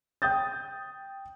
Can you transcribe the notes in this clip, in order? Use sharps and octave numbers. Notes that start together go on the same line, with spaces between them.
G5 D#6 G6 A6